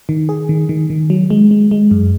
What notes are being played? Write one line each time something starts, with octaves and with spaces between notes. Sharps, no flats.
D#3
G#4
D#3
D#3
D#3
F#3
G#3
G#3
G#3
F#2